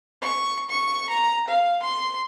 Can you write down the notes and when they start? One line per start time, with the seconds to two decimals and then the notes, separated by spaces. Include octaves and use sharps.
0.22 C#6
0.70 C#6
1.10 A#5
1.48 F5
1.82 C6